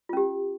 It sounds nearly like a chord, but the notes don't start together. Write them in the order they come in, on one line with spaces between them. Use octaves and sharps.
F4 C#4 G4